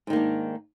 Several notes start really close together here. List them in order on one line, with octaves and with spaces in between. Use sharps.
G#2 D#3 A#3 D4